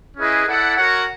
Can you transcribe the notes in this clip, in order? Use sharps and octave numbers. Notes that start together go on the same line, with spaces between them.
C#4 E4 G#4 B4 D#5
E4 A4 D5 F#5
F#4 A#4 C#5 F#5